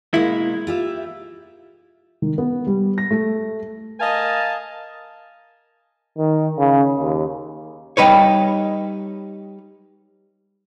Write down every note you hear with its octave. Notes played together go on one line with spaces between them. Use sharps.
B2 G#3 A#3 E4
F4 G4 E5
D#3
B3
G3
A#6
A3
A#4 D#5 F5 G#5 A5
D#3
C#3
D#2
G3 D#4 B4 C#5